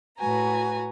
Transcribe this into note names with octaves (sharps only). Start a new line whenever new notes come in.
A2 F#4 B4 G#5 A#5